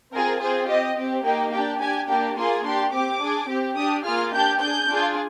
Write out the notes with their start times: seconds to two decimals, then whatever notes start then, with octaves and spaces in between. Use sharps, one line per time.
0.12 C4 F4 G#4 A#4
0.40 C4 F4 G#4 C5
0.68 C4 G4 D#5
0.96 C4 G4
1.24 A#3 D#4 G4 G5
1.52 D4 G4 G5
1.80 D4 G4 G#5
2.08 A#3 D4 G4 G5
2.36 A#3 F4 G#4 C6
2.64 D4 G4 C6
2.92 C4 G4 D6
3.20 D4 G#4
3.48 C4 G4
3.76 D4 G4 D#6
4.04 A#3 F4 G#4 F6
4.32 D4 G4 G6
4.60 D4 G#4 G6
4.88 D4 F4 G#4